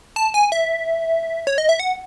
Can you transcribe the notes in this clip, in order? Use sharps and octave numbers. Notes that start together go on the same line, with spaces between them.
A5
G#5
E5
C#5
D#5
E5
F#5